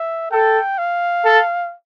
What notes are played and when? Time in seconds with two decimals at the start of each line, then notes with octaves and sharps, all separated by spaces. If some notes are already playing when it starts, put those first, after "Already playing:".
Already playing: E5
0.31 A4 G5
0.78 F5
1.24 A4